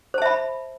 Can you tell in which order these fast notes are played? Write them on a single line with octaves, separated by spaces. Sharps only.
C5 A5 E5 B5